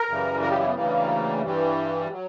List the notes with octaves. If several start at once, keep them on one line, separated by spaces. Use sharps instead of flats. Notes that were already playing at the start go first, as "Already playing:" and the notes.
Already playing: A#4
F#2 C#3 E3 G3
A#4
G4
E4
B3
D2 C#3 E3 G3 A#3
G2 E3 G3
F#3